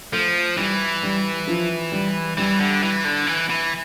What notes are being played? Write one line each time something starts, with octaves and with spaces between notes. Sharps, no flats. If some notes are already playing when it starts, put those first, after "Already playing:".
F3 A3
E3 G3
G3
F3
G3
E3 G3
D3
E3
D3
E3
E3